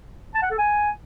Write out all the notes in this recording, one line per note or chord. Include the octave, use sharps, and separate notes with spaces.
A5
F#5
A4
G#5